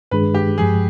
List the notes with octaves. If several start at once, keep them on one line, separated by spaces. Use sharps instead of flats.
G2 D#3 G#3 D4 G#4 B4
G4
G2 F3 G#3 G#4